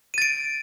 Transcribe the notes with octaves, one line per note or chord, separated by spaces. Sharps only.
A6 D7 D#7